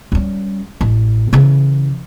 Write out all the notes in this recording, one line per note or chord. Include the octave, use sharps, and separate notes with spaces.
G3 C#4
A1
C#3 E3